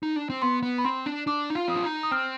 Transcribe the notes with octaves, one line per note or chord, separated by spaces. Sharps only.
D#4
D4
C4
B3 C6
B3
B5
C4 C6
D4
D4 D6
D#4
F4
C4 D#6
D4
D#4
D#6
C4 F6